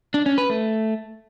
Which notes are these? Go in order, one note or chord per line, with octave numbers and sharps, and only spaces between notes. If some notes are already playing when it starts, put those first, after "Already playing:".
D4
C#4
B4
A3